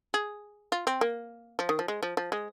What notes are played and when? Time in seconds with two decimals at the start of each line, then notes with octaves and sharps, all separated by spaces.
0.14 G#4
0.72 F4
0.87 C4
1.01 A#3
1.59 F3
1.69 D#3
1.79 F3
1.88 G#3
2.03 F3
2.17 F3
2.32 G#3